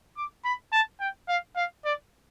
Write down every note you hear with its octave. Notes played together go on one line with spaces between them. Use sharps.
D6
B5
A5
G5
F5
F5
D5